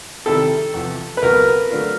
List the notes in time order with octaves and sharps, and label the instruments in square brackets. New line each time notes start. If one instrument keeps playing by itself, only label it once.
[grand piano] C3 D#3 G3 C4 E4 [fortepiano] A4
[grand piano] E2 C3 F3
[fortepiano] B4
[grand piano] C#2 B2 F#3 [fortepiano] A#4
[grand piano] D3 F#3 A3 D4 F4